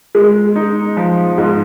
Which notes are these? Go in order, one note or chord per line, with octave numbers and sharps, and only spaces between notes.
G#3
D#4
F3
G#2